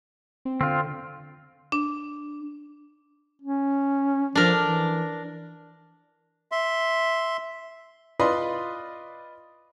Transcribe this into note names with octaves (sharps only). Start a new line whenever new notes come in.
C4
D3 C4 F4
D4
C#4
F3 D4 A#4
E3
E5 C6
F4 B4 D5 D#5 B5 C6